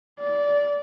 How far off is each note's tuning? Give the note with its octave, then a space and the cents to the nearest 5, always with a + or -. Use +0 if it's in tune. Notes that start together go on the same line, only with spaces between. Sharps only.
D5 -20